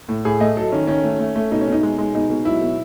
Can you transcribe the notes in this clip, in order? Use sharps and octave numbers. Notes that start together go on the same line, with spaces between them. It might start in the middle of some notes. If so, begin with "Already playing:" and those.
A2
A2 G#4
A3 D#5
F#3 A4
D#3 C#4
D#3 C#4
A3
A3
A3
B2 D#4
C#4
B2 D#4
G#3
G#3
B2 D#4
B2
F#3 E4
B2